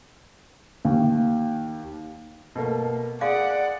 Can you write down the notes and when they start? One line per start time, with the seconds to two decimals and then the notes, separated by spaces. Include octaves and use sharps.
0.85 D#2
2.55 B2 A3 A#3
3.21 G#4 D5 F5 F#5